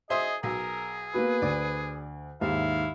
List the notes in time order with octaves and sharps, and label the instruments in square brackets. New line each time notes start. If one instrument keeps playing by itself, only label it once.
[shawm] G#4 [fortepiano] C5 E5 C6 [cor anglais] D#5
[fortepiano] B1 [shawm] G#4 [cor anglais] A#4
[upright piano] A#3 B3 F#4 [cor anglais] B4
[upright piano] D2 [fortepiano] D5
[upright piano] D#2 G#2 [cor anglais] E4 [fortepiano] E5 [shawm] F5